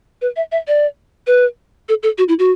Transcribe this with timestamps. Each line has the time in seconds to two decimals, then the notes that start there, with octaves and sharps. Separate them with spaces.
0.22 B4
0.36 E5
0.52 E5
0.68 D5
1.27 B4
1.89 A4
2.03 A4
2.18 F#4
2.29 E4
2.39 F#4